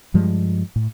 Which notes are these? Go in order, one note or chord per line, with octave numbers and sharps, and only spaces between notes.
G2 F3 G3 G#3
A2